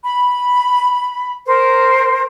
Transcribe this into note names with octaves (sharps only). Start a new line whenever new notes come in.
B5
A#4 C5